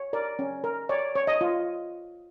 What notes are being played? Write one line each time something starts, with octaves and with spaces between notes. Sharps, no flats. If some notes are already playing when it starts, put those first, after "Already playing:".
Already playing: C#5
A#4 D5
C#4
A#4
C#5 D5
C#5
D#5
F4